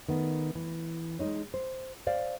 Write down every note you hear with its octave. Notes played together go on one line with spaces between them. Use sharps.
D#3 A3 B3
E3
G#3 D#4 C#5
C5
C5 D5 F5